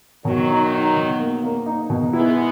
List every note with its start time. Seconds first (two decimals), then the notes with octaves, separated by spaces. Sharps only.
0.25 B2 D#3 F#3
0.50 D#4
0.73 D#4
0.97 B2
1.19 A#3
1.43 A#3
1.66 D#4
1.90 B2
2.13 G#3 B3 E4